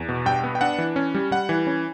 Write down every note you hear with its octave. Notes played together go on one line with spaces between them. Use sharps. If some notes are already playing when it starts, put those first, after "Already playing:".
Already playing: E2
B2
G2 G5
B3
G5
D4 F#5
E3
C#4
G3
G3 F#5
E3
C#4